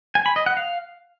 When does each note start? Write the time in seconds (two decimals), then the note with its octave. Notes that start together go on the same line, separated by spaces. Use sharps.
0.15 G#5
0.26 B5
0.36 D#5
0.46 F#5
0.57 F5